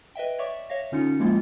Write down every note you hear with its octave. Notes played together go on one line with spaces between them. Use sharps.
B4 D#5 E5 G5
C#5 D5 E5 C#6 D6
C#5 E5 F5 A#6
D3 C#4 D#4 F4 C#7
F3 G#3 A#3 E4 F4